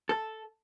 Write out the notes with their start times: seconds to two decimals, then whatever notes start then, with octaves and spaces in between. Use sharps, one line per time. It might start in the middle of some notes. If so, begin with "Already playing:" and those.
0.09 A4